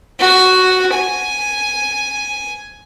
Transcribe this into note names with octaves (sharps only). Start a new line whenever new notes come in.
F#4
G#5